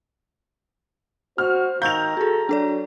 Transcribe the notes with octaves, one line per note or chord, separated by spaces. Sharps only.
F#4 C5 F6
D#3 F5 A#5 C#6 E6 G6 F7
F#4 G#4 A4
F#3 D4 A4 D5